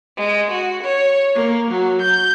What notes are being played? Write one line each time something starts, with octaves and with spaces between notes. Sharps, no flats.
G#3
F#4
C#5
A#3
F#3
G6